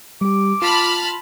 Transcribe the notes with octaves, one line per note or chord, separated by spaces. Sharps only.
G3 G4 D6
F4 A5 B5 C6 F6